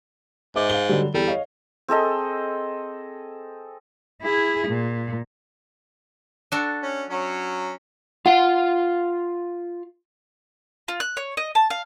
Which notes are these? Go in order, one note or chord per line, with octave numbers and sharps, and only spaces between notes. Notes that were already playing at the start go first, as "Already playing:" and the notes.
G#2 D#5 E5 D6
F5 G7
D3 F#3 G3
E2 G3 A4
C#5 D#5 F5
C4 G#4 A4 D#5
E4 G#4
A#2
D4 F#4 A4
C#4
F#3 C#4
F4 F5 F#5
F4
F#6
C#5
D#5
A5
F5